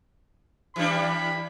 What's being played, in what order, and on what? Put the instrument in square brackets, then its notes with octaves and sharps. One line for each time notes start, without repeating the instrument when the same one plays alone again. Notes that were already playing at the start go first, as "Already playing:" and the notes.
[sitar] E3 G3 D4 [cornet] B5